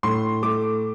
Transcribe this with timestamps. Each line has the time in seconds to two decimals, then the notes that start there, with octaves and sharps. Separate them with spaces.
0.03 A2 C6
0.42 A3 D6